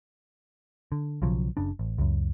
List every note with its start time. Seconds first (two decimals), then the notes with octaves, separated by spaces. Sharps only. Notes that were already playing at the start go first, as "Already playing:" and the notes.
0.92 D3
1.22 B1 C#3 F3 F#3
1.57 F#1 C#3 D4
1.79 A1
1.98 C#2 F#2